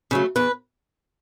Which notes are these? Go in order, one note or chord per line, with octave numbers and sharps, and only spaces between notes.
C#3 F#3 A3
E2 B4